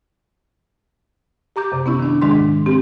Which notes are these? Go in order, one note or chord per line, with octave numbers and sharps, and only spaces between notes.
G4 A#5 D6 G6
F#2 C3
B3 C#4 E4
D#3 D4
G#2 D#3 G#3 D4 C6
C4 G4